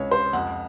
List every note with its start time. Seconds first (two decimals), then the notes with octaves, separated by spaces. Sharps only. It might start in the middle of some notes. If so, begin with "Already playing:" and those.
Already playing: C#2 C3 C#5
0.11 C5
0.33 F2 F#5